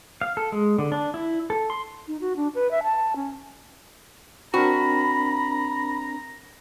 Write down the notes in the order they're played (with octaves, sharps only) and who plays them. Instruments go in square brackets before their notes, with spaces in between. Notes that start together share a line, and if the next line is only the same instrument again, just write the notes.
[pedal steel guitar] F5
A4
G#3
D3
D4
E4
A4
C6
[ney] D#4
F#4
D4
B4
E5
A5
C#4
[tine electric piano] C4 D4 A#4 [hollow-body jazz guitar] F#4 [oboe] A#5 [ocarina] B5